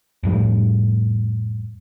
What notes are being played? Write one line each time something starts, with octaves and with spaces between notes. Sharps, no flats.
F2 A2 G3